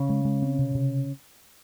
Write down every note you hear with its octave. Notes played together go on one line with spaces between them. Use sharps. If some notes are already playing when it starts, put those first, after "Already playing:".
Already playing: C#3 C#4
G#3
G#3
C4
C3
C3